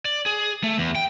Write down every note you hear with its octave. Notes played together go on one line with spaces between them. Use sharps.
D5
G#4
A3
E2
G5